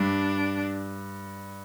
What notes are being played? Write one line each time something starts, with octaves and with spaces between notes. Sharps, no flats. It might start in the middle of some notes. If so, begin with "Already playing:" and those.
Already playing: G2 D4